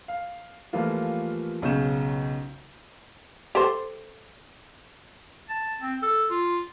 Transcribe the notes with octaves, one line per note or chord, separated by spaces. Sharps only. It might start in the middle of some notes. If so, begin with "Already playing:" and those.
F5
E3 F3 G3 A3 A#3 F4
B1 C#3 C#6 G6 E7
G4 A4 C5
A5
C4
A4
F4